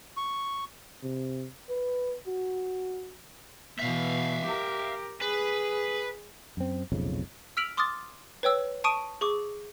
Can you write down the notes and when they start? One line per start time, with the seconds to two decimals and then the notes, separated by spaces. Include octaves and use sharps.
0.17 C#6
1.03 C3
1.69 B4
2.27 F#4
3.79 B2 E3 E5 F5
4.45 G4 A#4
5.21 G#4 B4
6.57 F#2 C4
6.92 F1 B1 F2 C#3
7.57 E6 F6 B6 D7 F7 F#7
7.77 C6 D6 D#6 F6 A6
8.43 B4 C#5 G5 E6
8.84 A5 C#6 D#6 D7 D#7
9.21 G#4 C#6 D6